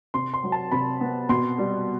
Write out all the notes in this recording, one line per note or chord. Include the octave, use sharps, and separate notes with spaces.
C3 C6
C6
F#3
A5
C3 B5
B3
B2 C6
G3